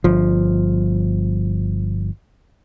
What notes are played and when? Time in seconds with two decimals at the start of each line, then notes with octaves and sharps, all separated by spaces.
0.04 G1 F3